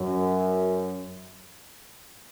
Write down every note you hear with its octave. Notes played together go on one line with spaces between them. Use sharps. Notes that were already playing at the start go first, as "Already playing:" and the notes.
Already playing: F#2